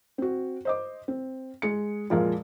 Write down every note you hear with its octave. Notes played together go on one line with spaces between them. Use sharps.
C4 F#4
C5 D#5 D6
C4
G#3 C#7
F2 A#2 G#3 F5